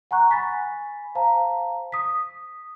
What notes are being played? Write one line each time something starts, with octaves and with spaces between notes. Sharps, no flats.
F#5 G#5 A#5 C#6 F#6
G#5 B5 A6 B6
C5 F5 A5 A#5
D#6 B6